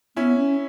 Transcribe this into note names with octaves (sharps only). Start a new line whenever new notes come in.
B3 C#4 E4
C#4